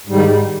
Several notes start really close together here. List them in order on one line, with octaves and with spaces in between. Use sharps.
G#2 G3 D#3